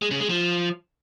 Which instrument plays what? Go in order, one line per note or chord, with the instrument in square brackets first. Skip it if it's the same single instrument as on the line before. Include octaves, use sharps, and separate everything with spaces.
[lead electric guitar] G#3
C#3
G#3
F3